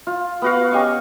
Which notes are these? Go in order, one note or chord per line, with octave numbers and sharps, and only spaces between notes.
F4
B3 F#4 F5
C#4 G4 D#5 C#6